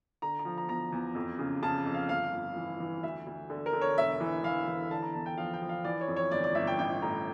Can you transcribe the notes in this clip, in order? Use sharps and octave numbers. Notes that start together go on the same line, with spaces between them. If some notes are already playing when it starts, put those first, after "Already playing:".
D3 A#5
A#5
F3
A#5
E2 A#5
E2
F2
C#3
C#3 A5
F2
F5
G1 F5
G1
E3
E3
D2 E5
D2
D3
A#4
D3
C#5
E1 E5
E3
E3 F5
E3
D3 A5
A#5
E2 A5
G5
F3 F5
G5
F3
F5
E3 D5
C#5
F2
C#5
G1 D5
D5
G1 E5
G5
A1 G5
A2 A#5